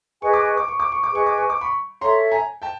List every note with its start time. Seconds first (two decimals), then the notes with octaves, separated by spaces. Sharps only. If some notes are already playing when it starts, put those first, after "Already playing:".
0.22 G#4 B4 D#5 G#5 C#6
0.33 D6
0.45 C#6
0.57 D6
0.68 C#6
0.80 D6
0.92 C#6
1.03 D6
1.12 G#4 B4 D#5 G#5 C#6
1.26 D6
1.38 C#6
1.50 D6
1.61 B5 C#6
2.01 A4 C#5 E5 A#5 C6
2.31 G#5 A#5
2.62 G5 A5